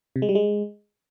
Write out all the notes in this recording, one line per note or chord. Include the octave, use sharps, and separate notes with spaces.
C3
G#3
G3
G#3